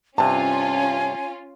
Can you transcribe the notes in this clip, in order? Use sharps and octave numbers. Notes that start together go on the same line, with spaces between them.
G2 C3 C#4 F4 G#5 A5